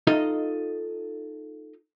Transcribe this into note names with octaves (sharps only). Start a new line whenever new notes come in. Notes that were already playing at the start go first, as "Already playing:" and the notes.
D#4 F4 A4 D#5